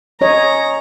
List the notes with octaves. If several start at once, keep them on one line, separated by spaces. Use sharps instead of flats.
C#4 C#5 D#5 A#5